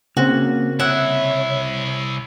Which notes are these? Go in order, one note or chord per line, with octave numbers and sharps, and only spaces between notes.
C#3 A#3 C4 C#4 F#4
C2 E4 C#5 E5 F#5